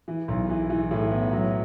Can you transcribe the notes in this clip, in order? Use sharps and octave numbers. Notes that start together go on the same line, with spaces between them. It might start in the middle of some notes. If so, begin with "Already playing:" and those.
E3
B1
E3
E3
A2
B3
F#3